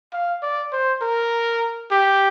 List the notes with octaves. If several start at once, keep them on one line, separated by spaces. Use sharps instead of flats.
F5
D5
C5
A#4
G4